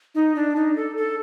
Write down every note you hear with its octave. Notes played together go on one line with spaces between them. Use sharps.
D#4
D4
D#4
A4
A4